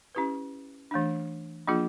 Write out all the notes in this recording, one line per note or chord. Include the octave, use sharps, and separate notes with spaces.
C#4 E4 G4 B4
E3 A3 D4
F3 A#3 D4 F4 G#4